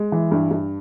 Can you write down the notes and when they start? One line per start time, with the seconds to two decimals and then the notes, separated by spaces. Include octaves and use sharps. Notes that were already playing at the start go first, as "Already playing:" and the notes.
Already playing: G#3
0.12 E3
0.31 G2
0.51 G2